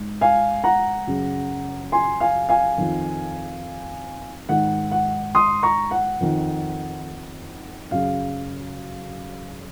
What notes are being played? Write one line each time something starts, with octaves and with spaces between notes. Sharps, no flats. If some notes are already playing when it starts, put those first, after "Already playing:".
Already playing: G#2
F5 G#5
F#5 A#5
F#2 C#3
G#5 C6
F5 G#5
F5 G#5
F2 D#3
G#2 D#3 F#5
F#5
C6 D#6
A#5 C#6
F#5
F2 D#3
F#2 C#3 F5